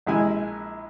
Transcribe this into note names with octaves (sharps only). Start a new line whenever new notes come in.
A#1 G#3 E4 G#5